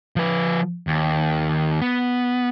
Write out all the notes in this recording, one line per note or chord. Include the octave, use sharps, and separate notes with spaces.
F3 B4
D#2
B3